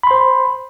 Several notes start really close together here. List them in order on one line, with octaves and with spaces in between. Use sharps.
B5 C6 C5